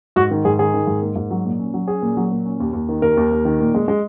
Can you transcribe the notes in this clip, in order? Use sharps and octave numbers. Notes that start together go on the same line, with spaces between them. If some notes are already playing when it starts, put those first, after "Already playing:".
G#2 F#4
D#3
G#2 G#4
D#3 G#4
D#3
G#2
A#3
G#2
F#3
A#2
C#4
F#3
C#4 G#4
A#2
F#3
A#2
C#4
D#2
D#2
D#3
D#2 A#4
D#2
D#2
D#3
A#2
G#3
G#3